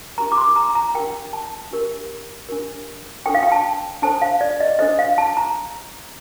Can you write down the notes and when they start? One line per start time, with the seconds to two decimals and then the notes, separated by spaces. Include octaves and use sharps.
0.18 D4 G4 A#4 A#5
0.32 D6
0.37 C6
0.56 A#5
0.75 A#5
0.95 D4 G4 A#4 G5
1.33 A5
1.71 D4 G4 A#4
2.49 D4 G4 A#4
3.26 D4 A4 C5 G5
3.35 F5
3.43 G5
3.52 A5
4.02 D4 A4 C5 A5
4.22 F5
4.41 D5
4.60 D#5
4.79 D4 A4 C5 D#5
4.99 F5
5.18 A5
5.37 A#5